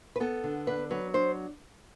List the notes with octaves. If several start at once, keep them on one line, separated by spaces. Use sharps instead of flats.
B4
B3 A4
D3
D4 B4
F#3 B4
D4 C5